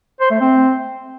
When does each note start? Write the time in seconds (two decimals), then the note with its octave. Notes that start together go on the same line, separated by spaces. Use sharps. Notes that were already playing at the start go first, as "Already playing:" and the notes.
0.20 C5
0.30 A3
0.41 C4